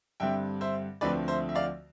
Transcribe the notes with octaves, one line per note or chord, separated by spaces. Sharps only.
G2 D3 G3 C4 E5 G5
C5 E5
D2 D3 F3 A3 C4 B4 D5
C5 E5
E5
D5 F5